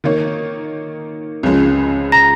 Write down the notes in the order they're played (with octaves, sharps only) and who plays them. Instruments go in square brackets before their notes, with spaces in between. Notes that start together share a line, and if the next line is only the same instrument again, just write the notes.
[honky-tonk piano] D#3 A#3 D#4 C#5
C#2 C#3 F3 G#3
[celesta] A#5 A#6